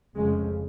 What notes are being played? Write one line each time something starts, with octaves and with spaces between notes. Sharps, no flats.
F1 F2 C#3 G#3